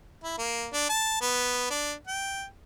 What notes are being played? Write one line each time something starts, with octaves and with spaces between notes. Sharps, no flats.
E4
A#3
D4
A5
B3
D4
G5